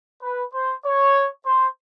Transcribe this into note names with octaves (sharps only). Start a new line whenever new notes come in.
B4
C5
C#5
C5